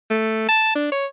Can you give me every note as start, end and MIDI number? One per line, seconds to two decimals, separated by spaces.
0.10 0.45 57
0.48 0.74 81
0.75 0.89 62
0.92 1.06 73